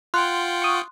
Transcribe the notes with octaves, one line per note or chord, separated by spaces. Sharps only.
F4 F#5 G5 C6 F#6
C#6 D#6